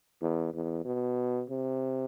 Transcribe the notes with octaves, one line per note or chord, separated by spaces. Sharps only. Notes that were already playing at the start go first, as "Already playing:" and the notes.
E2
E2
B2
C3